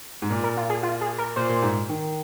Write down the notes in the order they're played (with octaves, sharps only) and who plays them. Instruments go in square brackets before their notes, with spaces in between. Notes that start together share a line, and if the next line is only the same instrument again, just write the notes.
[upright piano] G#2
A#2
[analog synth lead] A#4
F4
G#4
F4
G#4
A#4
[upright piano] A#2 [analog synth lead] C5
[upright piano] A#2
G#2
D#3